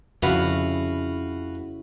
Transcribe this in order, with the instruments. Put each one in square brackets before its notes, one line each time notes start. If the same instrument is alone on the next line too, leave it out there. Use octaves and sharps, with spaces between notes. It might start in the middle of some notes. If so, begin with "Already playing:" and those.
[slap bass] F2 [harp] C#3 C#4 E4 [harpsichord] F#4 B4 F5